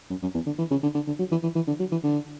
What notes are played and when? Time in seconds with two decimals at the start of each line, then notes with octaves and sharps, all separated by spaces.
0.10 F#2
0.22 F#2
0.34 E2
0.46 D3
0.58 E3
0.71 C#3
0.83 D3
0.95 D3
1.07 D3
1.19 F#3
1.31 E3
1.43 E3
1.55 E3
1.67 D3
1.80 F#3
1.92 E3
2.04 D3